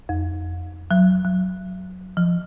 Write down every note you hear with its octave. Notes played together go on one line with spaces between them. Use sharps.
F2
F#3
F#3
F3